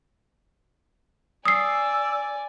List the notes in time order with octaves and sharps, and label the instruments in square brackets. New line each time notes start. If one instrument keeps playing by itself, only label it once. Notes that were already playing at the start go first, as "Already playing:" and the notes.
[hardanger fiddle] D5 G#5 [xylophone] D#6 C7 [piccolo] E6